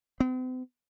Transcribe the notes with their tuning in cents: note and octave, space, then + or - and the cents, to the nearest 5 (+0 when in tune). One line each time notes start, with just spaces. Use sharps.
C4 -45